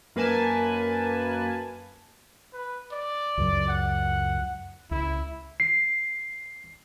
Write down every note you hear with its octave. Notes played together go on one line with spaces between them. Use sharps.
F#2 A#3 B4 G#5 A5
B4
D5
C#2 F#2 F#3
F#5
C#2 E4
C7